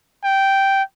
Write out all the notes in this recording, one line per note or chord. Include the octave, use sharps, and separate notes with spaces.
G5